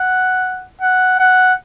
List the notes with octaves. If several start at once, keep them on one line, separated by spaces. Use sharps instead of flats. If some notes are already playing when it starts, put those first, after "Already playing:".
Already playing: F#5
F#5
F#5